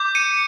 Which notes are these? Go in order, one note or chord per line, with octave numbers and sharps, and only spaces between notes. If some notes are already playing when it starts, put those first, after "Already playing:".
Already playing: D6 G6
C#7 D#7